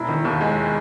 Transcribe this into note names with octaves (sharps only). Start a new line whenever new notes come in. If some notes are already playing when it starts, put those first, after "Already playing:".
Already playing: E1 E4
D#3
D#2
G#3